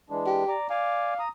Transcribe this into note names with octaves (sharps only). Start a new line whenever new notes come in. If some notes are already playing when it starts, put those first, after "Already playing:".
E3 G#3 D4
G4
D5 A#5 D6
D5 F5 G#5 D6
A#5 D#6